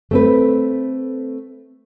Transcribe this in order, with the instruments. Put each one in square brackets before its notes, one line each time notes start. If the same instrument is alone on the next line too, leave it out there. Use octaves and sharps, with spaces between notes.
[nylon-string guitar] A3 C4 B4